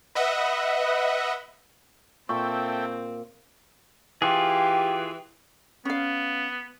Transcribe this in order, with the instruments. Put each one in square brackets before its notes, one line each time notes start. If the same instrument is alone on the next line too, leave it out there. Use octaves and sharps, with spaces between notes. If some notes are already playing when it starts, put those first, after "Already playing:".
[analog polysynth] B4 D#5 E5 F#5
[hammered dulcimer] A#2 [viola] C4 [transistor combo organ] A4 E5 G5 [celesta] C#6
[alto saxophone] E3 [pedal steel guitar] F4 G#4 [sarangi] G4
[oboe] B3 [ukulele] C#4 F5